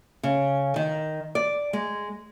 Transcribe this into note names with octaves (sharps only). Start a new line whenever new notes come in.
C#3
D#3
D5
G#3